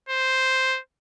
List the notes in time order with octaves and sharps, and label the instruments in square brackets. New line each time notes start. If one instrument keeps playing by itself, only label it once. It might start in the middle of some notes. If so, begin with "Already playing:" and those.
[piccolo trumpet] C5